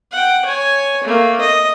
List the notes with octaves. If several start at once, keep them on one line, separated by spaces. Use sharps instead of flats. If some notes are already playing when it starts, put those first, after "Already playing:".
F#5 G5
C#5 G#5
A3 A#3
D#5